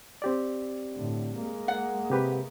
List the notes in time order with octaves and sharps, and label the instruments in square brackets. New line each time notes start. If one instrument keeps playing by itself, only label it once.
[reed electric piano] C4 G4 D5
[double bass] A2 D3
G#3 A#3
[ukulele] F#5
[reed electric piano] C3 G4 B4